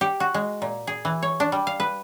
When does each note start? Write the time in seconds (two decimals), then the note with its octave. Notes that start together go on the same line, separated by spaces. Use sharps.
0.01 G4
0.20 F#4
0.34 G#3
0.62 A#2
0.87 G#4
1.05 E3
1.22 C#5
1.40 D4
1.52 G3
1.67 F5
1.80 B4